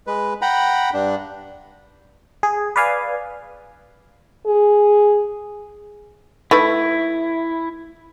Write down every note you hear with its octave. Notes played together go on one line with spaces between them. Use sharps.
G#3 B4
F#5 G5 A#5 B5
G2 D4
G#4
B4 D5 F5 G#5
G#4
A3 D#4 E4 B4